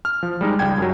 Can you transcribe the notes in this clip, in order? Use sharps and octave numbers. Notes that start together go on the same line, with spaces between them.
F6
F3
G3 G#3 D#4
C#2 G3 G5 G#6
F#2 F#3